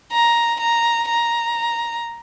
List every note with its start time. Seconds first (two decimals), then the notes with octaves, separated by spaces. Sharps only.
0.12 A#5
0.60 A#5
1.09 A#5